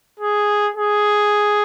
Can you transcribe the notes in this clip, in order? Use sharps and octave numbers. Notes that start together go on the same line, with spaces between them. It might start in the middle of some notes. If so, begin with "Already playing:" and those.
G#4
G#4